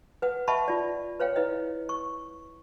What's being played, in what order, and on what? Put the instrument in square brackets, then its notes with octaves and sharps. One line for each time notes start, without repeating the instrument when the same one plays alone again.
[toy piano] B4 F#5
D#5 E5 F#5 A5 B5 C#6
F4 D5
B4 C#5 F5 G5
E4 B4 D#5
C#6